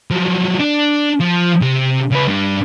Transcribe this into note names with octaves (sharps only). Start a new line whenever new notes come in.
F3 F#3
D4
F3
C3
C#3 B4
G2 D4